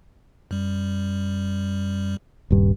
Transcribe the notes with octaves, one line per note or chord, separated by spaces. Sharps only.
F#2 G3
D#1 G2